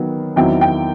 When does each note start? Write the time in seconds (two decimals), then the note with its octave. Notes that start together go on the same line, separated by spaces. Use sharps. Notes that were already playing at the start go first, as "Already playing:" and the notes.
Already playing: D#3 F#3 B3
0.36 E2 D#3 F#3 C4 E4 G5
0.61 G5